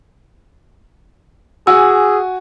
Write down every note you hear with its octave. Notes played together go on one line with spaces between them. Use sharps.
F#4 G#4 G#5 E6